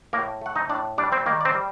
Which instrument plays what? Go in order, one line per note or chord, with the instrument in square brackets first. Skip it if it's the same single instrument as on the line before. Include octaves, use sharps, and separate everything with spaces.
[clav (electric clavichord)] A2 A#3 A#4
A3 F#5
D#4 D#5
A2 D4 D5
G3 D4 D5
C4 C5
D#3 A#3 A#4
D5
C4 C5
G3